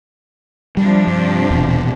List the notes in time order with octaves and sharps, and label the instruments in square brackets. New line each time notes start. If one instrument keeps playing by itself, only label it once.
[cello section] C3 F3 D4 [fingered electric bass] G3
[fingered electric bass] G2
D#1 E2 B2